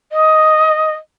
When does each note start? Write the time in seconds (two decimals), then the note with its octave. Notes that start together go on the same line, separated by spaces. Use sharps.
0.12 D#5